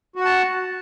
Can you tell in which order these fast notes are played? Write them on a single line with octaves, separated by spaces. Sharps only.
F#4 F#5 A5